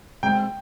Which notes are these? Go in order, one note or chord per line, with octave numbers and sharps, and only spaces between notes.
B2 G#3 C4 G5